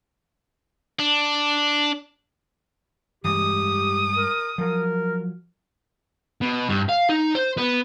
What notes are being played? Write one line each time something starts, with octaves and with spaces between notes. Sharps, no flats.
D4
G2 E3 G#3 G4 D#6
A#4
F3 F#3 A#4
B2
G2
F5
D#4
C5
B3